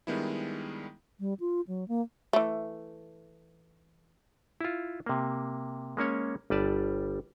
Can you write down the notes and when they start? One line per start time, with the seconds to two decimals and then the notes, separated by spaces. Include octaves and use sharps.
0.07 D#3 G3 G#3 B3 D4 E4
1.20 G3
1.40 F4
1.68 F#3
1.88 A#3
2.33 E3 A3
4.61 E4 F4
5.06 C3 A#3
5.97 G#3 A#3 C#4 C#5
6.50 G1 G3 B4 D5 A5